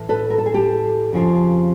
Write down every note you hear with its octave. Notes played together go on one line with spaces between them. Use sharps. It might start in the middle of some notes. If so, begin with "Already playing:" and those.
Already playing: A2 E3
A4 B4
A#4
A4
G#4
G4 A4
F2 C#3 F3